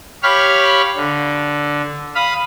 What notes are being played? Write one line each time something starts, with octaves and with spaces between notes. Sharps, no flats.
G4 C#5 F5 B5 C#6 F6
D3
F5 B5 D#6